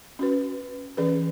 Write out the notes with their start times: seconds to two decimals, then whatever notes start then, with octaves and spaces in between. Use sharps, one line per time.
0.19 C#4 F#4 B4
0.97 E3 C#4 G#4 B4